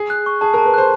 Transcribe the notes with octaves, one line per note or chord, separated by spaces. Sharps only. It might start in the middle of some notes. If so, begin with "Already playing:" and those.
Already playing: G#4
F#6
C#6
G#4 A5
A#4
A5
B4
C5 F#6